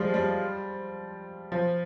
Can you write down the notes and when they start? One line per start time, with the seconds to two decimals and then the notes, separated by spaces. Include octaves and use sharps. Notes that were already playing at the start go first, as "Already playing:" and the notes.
Already playing: F3 G3 G#3
0.14 G3
1.52 F3